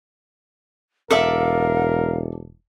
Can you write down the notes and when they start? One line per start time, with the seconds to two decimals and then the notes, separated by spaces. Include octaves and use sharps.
1.11 E1 A4 A#4 D5 E5 F5